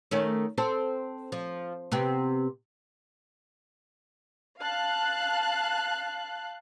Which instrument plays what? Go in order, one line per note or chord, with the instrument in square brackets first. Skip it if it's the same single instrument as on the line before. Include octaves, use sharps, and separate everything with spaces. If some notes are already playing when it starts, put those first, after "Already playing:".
[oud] D#3 A3 C#4
C4 A4 C5
F3
C3 B3 C4
[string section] F5 A5 F#6